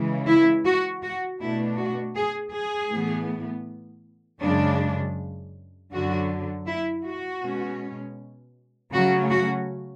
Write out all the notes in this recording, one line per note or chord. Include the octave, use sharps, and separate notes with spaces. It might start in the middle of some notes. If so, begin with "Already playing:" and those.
Already playing: C#3 E3 G#3
E4
F#4
F#4
B2 A3 D4 E4
F#4
G#4
G#4
A2 E3 B3
F#2 C#3 G#3 D4
F#2 D3 F#3 F#4
E4
F#4
B2 G#3 C#4
C#3 F#3 A3 C#4 F#4
F#4